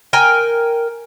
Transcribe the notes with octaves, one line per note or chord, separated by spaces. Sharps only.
A#4 G5 G#5